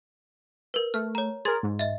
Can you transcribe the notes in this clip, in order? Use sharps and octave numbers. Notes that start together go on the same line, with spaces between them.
A#4 B4
A3 F6
C#5 A#5
G#4 A#4 C6 G#6 A6
G#2
D#5 E5